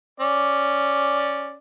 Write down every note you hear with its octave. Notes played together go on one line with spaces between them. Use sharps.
C#4 D5